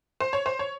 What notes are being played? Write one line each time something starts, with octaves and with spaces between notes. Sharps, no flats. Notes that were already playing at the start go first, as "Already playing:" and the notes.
C5
C#5
C5
C#5